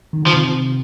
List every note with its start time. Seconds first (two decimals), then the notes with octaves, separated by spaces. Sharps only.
0.13 D#3
0.22 D3
0.27 F3
0.33 C3
0.44 C3